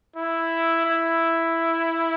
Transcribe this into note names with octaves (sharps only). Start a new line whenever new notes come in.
E4
E4